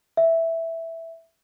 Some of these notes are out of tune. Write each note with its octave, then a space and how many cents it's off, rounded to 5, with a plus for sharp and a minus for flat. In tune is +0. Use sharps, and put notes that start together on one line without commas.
E5 +0